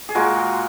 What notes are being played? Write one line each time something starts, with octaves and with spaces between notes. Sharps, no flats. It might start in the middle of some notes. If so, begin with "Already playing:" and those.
G#4
A#2 G#3 F#4 A#4